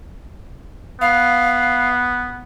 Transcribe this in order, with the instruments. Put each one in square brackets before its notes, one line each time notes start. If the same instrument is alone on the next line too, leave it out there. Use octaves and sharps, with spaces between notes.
[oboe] B3 [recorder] F5